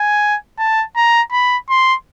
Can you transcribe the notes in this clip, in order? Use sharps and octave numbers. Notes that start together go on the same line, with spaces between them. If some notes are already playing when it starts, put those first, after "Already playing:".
Already playing: G#5
A5
A#5
B5
C6